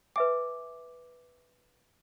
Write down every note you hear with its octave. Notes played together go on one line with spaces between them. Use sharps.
B4 E5 G#5 D6